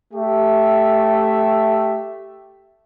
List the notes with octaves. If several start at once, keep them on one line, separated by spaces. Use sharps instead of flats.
A3 G4 E5